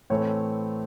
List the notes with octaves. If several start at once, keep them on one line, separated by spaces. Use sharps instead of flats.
A2 E3 A3 C4 C#5